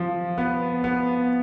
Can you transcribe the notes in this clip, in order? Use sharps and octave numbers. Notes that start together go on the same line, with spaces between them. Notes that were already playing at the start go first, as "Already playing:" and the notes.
Already playing: F3
B3
B3